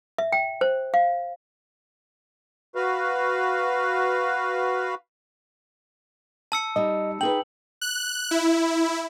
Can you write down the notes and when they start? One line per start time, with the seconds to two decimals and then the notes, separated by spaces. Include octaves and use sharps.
0.18 E5
0.32 G5
0.61 C5
0.94 F5
2.75 F#4 B4 F5
6.52 A5 E6 C#7
6.76 G3 D#4 D#5
7.21 D#4 G#4 B4 G5 F#7
7.81 F#6
8.31 E4